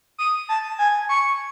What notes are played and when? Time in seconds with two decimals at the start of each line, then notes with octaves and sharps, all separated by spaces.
0.18 D#6
0.49 A5
0.78 G#5
1.09 C#6